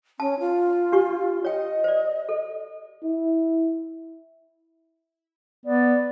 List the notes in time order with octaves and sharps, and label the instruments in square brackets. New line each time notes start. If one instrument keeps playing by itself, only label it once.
[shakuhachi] C#4 [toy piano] A5
[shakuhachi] F4
[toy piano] D4 G4 C#6
[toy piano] C#5 G5 [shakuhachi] D#5
[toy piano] C5 D5
A4
[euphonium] E4
[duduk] B3 [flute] D5